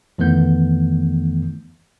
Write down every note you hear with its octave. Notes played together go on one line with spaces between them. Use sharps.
F2 D#3 E3 A3 B3 G6